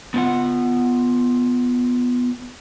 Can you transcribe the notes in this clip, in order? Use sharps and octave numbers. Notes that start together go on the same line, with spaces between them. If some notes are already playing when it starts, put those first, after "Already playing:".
B3 F4 F#5